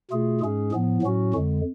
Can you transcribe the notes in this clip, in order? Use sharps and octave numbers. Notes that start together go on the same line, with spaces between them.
B2 A3 F4 G#4
G#2 G#3 C#4 G#4
A2 F3 B3
A2 F#3 C#4 F#4
F2 D3 G#3